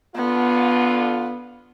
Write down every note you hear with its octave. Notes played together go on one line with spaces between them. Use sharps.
D3 B3 F4